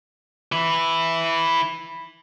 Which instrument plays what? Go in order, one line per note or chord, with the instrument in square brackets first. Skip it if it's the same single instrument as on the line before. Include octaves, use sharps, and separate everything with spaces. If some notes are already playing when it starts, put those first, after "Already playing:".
[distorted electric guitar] E3 E4